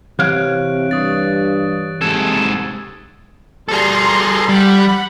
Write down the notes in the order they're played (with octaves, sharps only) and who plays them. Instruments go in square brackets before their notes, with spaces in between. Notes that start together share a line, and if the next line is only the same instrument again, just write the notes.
[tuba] C3 [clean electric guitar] E3 C#5 F5 [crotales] F#6 D7
[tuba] G2 [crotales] C#6 D#6 A6
[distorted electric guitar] G#2 A4 [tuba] C3 [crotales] E6 G#6
[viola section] G3 A#5 C6 [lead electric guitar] G#4 A4
[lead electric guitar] G3 [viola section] F#5 B5